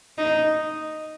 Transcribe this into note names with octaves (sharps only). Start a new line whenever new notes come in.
D#4